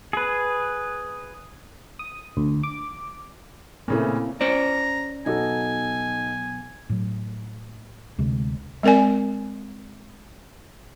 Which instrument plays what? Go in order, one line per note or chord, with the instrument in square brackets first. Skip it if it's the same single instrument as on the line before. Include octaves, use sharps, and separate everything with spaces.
[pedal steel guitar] G#4 B4
[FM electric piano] D#6
D2
D6
[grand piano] A#2 C#3 A3 [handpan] A#3 C4 E4
[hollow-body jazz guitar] C#4 C5 D5 [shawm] A#5
[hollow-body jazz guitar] B1 [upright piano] D#4 F#4 A4 [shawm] G#5
[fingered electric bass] A2 F#3
D2 C3 G#3
[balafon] G#3 C4 A#4 D5 G#5